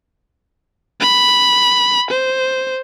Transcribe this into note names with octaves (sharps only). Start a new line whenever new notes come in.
B5
C5